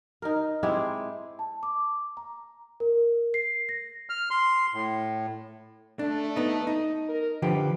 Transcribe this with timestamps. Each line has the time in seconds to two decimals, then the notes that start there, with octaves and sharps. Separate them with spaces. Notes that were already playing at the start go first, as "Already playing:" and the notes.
0.22 D#4 A#4
0.63 G#3 C4 E4 G4
1.39 A5
1.63 D6
2.17 A#5
2.80 A#4
3.34 C7
3.69 A#6
4.10 F6
4.31 C6
4.74 A2
5.99 A3 D4
6.36 B3 D#4
6.67 D#4
7.08 A#4
7.42 D3 F3 G4 B4